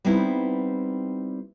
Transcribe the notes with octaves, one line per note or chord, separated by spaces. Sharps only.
G3 B3 C4 D#4 E4